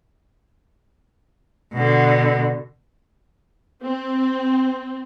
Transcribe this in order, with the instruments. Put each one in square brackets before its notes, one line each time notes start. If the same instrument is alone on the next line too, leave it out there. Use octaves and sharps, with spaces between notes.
[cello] B2 D3
[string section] C4